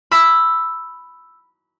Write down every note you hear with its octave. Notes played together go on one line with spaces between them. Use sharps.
B5 E6 B6